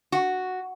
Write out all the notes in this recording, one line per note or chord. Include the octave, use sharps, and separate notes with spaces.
F#4